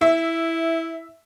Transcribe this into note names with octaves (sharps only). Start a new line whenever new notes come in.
E4 E5